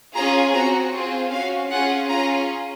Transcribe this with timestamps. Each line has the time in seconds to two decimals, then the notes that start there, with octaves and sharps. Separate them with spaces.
0.14 C#4 F4 G#4 A#5
0.52 C4 F#4 A#5
0.92 C4 F4 G#4
1.31 C#4 F#4 F5
1.70 C#4 F4 G#4 F#5
2.09 C#4 F4 G#4 A#5